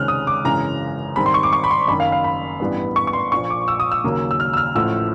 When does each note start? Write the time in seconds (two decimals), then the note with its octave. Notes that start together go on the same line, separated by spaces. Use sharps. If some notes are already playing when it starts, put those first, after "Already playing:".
Already playing: C#2 C3 D#3 G#3 C#4 F6 F#6
0.08 D#6
0.27 D6
0.45 G#1 F#2 C#3 E3 G#3 A#5
1.16 G#2 D#3 G3 C4 B5
1.26 C6
1.34 C#6
1.43 D6
1.53 C#6
1.64 B5
1.71 C6
1.88 F#1 F#2 D#3 B5
2.00 F5
2.12 F5
2.24 B5
2.60 A1 G2 E3 G3 B3
2.96 C#6
3.07 C#6
3.13 C6
3.31 A#1 A#2 F3 C#6
3.50 D6
3.68 E6
3.80 D#6
3.92 E6
4.04 D#2 C#3 F#3 A#3
4.31 E6
4.40 F6
4.53 E6
4.57 F6
4.75 A1 A2 F3 A3 E6